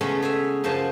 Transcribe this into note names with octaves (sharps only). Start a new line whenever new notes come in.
C#3 G#3 A3 B3 C#4
G#4 C#5 E5
F#2 C#3 F3 C5 A5